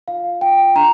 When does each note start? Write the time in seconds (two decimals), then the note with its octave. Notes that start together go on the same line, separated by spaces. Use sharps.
0.08 F4 F5
0.41 F4 G5
0.76 D4 A#5